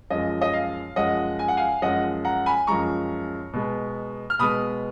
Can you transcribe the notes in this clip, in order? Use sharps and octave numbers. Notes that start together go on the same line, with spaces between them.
F#2 F3 G#3 D#5
D#5
F5
F#2 F3 G#3 D#5 F#5
G#5
F#5
F5 G#5
F#2 F3 G#3 D#5 F#5
F#5 A#5
G#5 B5
F#2 F3 G#3 A#5 C#6
B2 G#3 B3
F6
B2 G#3 B3 B5 D#6